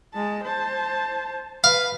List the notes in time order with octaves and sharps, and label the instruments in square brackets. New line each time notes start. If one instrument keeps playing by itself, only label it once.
[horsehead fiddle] G#3 A5
C5 A5
[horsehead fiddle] B4 [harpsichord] F5